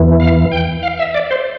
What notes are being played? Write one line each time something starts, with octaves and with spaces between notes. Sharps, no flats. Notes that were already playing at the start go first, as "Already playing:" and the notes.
Already playing: E2 E3
F5
G5
F5
E5
D5
C5